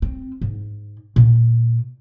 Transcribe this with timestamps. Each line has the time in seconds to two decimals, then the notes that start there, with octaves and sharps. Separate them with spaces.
0.02 C4
0.41 G#2
1.16 A#2